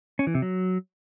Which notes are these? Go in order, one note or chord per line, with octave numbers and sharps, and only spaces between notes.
C#4
E3
C3
F#3